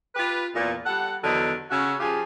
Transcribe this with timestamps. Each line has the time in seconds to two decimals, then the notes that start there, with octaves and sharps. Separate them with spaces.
0.15 F4 G4 B4
0.54 E2 A#2
0.86 G3 A4 F#5
1.23 E2 D3 D#3 F#3
1.71 C#3 C#4 F#4 E5
2.00 F3 F4 G4 G#4